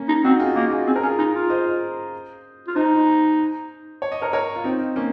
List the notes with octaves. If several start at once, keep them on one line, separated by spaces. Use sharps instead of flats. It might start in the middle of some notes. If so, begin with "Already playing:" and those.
Already playing: A#3 C#4
D#4
C4 D#4 F#4
F4 G#4
A#3 D#4 F#4
F4 G#4
C4 G#4
A#4
C#4 F4 G#4
D#4
F4
C5 D#5
F4
D#4 C5 D#5
C#5
D#5
A#4 C#5
A#4 C#5
F4
C4 D#4
A#3 C#4